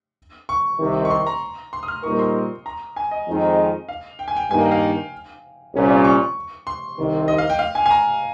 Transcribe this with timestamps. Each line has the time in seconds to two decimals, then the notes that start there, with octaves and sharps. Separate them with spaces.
0.49 C#6
0.80 C2 C3 D#3
1.05 C#6
1.11 C6
1.27 A#5
1.73 C6
1.83 D#6
1.88 F6
2.03 A#2 G3 C4 D#4 A#4 C#6
2.19 C6
2.66 A#5
2.96 G#5
3.11 D#5
3.27 F2 D#3 G#3 C4 D#4
3.89 F5
4.19 G5
4.28 G#5
4.37 G5
4.51 G2 D#3 A#3 D#4 G#5
4.61 G5
4.72 F5
5.74 C2 A#2 G3 C#4
6.04 C#6
6.67 C6
6.98 C2 C3 D#3
7.28 D#5
7.38 F5
7.50 G5
7.59 F5
7.75 G#5
7.86 G#5
7.91 A#5